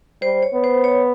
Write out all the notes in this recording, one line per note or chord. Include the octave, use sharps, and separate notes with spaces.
G3 C5
C#5
B3
C5
C#5